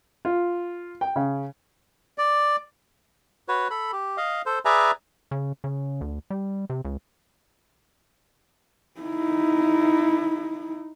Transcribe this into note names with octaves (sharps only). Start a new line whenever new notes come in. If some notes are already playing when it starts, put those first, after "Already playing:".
F4
G5
C#3
D5
F#4 B4 C#5
A4 B5
G4
D#5 F5
A4 C5
G#4 B4 D5 E5 G#5 A#5
C#3
C#3
D2
G3
C3
C#2
D#4 E4